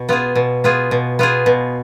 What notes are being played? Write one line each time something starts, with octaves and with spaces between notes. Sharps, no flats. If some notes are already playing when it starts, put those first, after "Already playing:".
Already playing: B2
B3 F4 G#4
B2
B3 F4 G#4
B2
B3 F4 G#4
B2